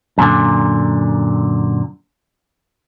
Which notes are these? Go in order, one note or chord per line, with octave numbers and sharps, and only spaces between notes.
F#2 A#2 D3